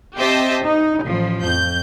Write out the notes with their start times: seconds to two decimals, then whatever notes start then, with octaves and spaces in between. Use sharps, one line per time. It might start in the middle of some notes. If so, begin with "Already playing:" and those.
0.17 C4 G4 C5 D#5 E5 A5
0.62 D#4
1.04 A1 F3
1.44 F2 G6